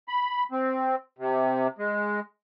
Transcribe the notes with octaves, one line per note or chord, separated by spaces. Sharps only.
B5
C4
C3
G#3